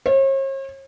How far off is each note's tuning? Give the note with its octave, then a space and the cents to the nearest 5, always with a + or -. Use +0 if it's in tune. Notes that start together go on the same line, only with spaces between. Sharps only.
C#5 -45